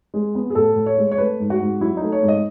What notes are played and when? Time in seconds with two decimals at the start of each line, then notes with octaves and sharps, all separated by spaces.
0.14 G#3
0.35 B3
0.50 G#4
0.55 A2 A4
0.76 A2
0.86 C#5
0.98 G#3
1.12 C#5
1.18 A3 B4
1.40 G#2
1.50 F#4
1.60 G#2
1.81 F#3 E4
1.97 A3 D#4
2.12 C#5
2.23 G#2
2.28 D#5